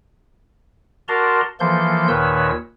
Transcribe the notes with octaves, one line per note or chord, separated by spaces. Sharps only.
F#4 A#4 D5 A5 A#5 C6
E3 F3 A#3 A4 C6 G6
D#2 A#2 D#3 B4 C#5 E6